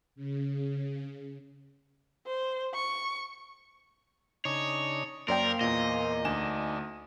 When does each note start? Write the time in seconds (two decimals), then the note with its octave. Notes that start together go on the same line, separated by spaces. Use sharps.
0.16 C#3
2.26 C5
2.74 C#6
4.45 C#3 D4 D#4 C#5
5.28 F#2 A#3 A#4 C5 D5 G5 C6
5.61 E2 A#2 D#5
6.25 D2 D4 D#4 G#5 E7